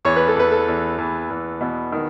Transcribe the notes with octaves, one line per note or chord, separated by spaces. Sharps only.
E2 C#5
B4
A4
E2 B4
A4
E2
E2
E2
B2
D#3